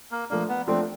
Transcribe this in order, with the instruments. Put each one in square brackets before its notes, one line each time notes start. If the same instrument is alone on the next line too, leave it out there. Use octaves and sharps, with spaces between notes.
[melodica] A#3
[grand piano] F3 A3 D4 [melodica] A#3
[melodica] B3
[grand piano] F3 A3 D4 [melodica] C4